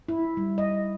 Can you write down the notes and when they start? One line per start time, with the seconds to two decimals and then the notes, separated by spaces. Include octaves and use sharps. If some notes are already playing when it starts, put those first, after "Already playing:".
0.09 E4
0.37 G3
0.58 D#5